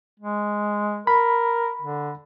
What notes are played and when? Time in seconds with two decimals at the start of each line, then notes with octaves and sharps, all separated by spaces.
0.20 G#3
1.07 A#4 B5
1.82 D3